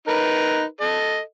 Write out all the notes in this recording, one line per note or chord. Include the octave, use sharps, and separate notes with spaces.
D#4 A#4 B4
A4 D#5